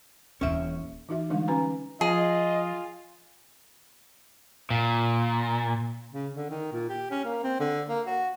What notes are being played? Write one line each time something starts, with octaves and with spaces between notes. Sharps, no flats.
D#1 E3 C#4 E5
E3 D#4 F#4 E5
D3 E3 G3 G#3 D4 D#4
C#4 F#4 B4 G#5 A#5
F3 F4 G#4 D#5
A#2
C#3
D3
D#3
A#2
G4
C#4
A#3
C4
D3
A#3
F#4